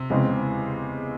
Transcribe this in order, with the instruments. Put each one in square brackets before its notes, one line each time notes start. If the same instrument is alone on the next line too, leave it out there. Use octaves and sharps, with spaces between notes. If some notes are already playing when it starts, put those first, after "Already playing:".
Already playing: [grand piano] C3
[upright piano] E2 C#3 G#3 C4